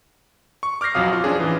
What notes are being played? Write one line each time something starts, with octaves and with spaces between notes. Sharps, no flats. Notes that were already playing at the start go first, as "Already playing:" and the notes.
C#6
D6 F6 G6 A#6 C7
B1 F2 F#3 F5 D#6
F4
F3 C#4 D4 G#4
A1 E3